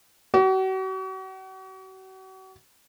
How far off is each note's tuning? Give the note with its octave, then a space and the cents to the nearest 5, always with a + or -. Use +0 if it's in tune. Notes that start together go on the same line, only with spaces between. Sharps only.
F#4 +40